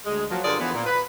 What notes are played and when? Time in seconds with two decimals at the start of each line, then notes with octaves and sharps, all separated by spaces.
0.06 D2 G#3
0.30 F3 F#3 A#3
0.44 G2 D3 F4 G#4 A#4 D5
0.60 D3 E3 F3 B3
0.74 A#2
0.87 B4